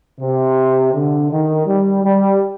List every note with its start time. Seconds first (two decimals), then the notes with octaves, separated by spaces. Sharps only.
0.21 C3
0.93 D3
1.30 D#3
1.67 G3
2.04 G3